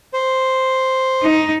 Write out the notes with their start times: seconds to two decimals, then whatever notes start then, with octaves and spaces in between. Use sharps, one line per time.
0.14 C5
1.23 D#4